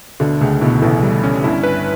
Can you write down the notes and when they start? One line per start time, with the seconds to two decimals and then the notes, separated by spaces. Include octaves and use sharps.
0.20 D2 B2 D3
0.41 C#2 C#3 A3
0.61 B1 B2 E4
0.82 A1 A2 E3
1.03 G3
1.23 C#4
1.44 G1 G2 E4
1.63 B4